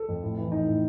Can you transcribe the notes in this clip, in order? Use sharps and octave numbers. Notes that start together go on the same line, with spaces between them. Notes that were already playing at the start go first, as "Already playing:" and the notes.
Already playing: A4
F2
A2
E3
E3 D#4
A2